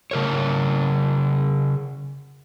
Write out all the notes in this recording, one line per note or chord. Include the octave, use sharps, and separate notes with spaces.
C#3 A#4 C#5